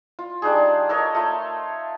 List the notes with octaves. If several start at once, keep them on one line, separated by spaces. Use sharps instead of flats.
F4
G3 D4 D#4 G#4
A4 A#4 C#5 D#5
A3 F4